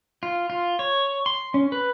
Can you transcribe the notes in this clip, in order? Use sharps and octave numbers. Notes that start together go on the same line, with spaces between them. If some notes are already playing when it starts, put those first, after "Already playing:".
F4
F4
C#5
C6
C#4
B4